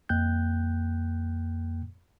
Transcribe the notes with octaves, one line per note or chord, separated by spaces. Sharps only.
F2 A#3 G5 F#6 G6